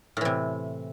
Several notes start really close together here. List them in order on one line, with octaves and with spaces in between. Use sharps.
A2 E3 C3